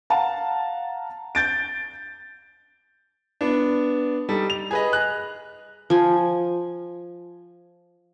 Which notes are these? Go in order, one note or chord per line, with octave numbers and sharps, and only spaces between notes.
F5 F#5 A5 A#5
G6 A6 D7
B3 D4
G3 D#4 A4
F7
G#4 B4 D#5
F#6
F3 G#5